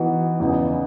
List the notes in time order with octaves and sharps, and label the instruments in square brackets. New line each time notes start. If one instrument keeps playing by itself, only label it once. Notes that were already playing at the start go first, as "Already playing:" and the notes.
Already playing: [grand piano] E3 B3 D#4 F#4
E2 C#3 E3 B3 D#4